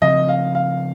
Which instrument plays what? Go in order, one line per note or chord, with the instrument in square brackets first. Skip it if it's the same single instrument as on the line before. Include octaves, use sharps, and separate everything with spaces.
[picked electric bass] C#3 F3 C4 [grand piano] D#5
[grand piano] F5
F5